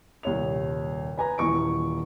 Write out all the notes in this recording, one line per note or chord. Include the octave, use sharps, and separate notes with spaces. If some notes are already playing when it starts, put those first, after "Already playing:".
D#1 C2 C#5 F7
B4 G#5 A#5
D#1 E3 C#6 D7